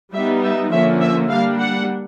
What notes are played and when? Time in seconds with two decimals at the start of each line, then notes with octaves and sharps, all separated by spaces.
0.13 G3 B3 D#4 E5
0.43 E5
0.72 D3 F3 A#3 C#4 E5
1.01 E5
1.29 G3 A#3 D4 F5
1.59 F#5